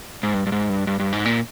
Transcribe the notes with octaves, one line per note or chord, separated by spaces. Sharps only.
G#2
G2
G2
G#2
G2
G2
G2
G#2
A#2